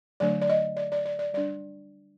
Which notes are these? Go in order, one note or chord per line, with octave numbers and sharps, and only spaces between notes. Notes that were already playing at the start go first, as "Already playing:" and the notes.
D3 F#3 A3 D4 D5
D5
D#5
D5
D5
D5
D5
G3 D4 D5